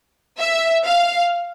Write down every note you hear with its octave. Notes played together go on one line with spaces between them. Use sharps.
E5
F5